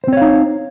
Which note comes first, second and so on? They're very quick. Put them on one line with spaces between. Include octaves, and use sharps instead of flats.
C5 C4 C#5 F5 D#4